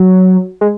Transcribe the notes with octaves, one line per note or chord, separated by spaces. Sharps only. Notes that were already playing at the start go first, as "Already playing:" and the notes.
Already playing: F#3
G#3